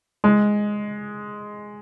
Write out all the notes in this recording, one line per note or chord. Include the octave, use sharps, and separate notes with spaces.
G#3